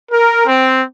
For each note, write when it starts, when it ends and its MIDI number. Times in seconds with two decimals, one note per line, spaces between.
0.12 0.43 70
0.46 0.82 60